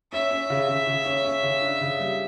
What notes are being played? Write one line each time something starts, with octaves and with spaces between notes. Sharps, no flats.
C#4 E5
C#4
C#3
C#3
C#3
C#4
C#4
C#3
D4
C#3
G3